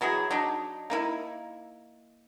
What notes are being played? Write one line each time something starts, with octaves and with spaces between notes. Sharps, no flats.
E3 F#3 E4 G#4
F#3 D4 D#4
A#3 D#4 E4